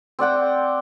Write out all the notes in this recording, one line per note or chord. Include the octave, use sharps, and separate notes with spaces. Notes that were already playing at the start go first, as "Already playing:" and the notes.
C4 D5 F#5 G5